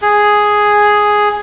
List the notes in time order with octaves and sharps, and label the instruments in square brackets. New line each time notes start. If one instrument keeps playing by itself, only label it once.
[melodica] G#4